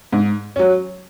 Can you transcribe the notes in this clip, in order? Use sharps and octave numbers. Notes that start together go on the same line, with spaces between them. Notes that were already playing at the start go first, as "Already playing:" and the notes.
G#2
F#3 C#4